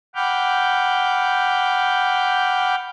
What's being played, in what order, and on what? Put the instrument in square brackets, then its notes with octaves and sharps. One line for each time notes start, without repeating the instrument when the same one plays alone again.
[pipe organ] F#5 G5 B5 D6 F6 G6